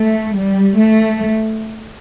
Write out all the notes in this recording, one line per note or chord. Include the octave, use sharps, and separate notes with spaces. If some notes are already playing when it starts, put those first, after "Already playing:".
Already playing: A3
G3
A3